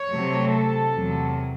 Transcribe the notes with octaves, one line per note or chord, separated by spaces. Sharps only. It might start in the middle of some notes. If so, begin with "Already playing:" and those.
Already playing: C#5
C3 F#3 A3
A4
E2 C3 F#3